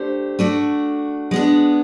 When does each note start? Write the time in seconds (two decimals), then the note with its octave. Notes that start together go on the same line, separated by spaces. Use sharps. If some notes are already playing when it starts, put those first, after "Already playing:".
Already playing: A3 D4 G4 C5
0.39 A3 D4 F#4
1.31 G#3 B3 D4